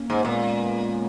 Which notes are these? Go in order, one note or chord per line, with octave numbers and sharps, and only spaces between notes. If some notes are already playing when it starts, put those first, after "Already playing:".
Already playing: A#3 C#4
G#2
A#2 G#3 B3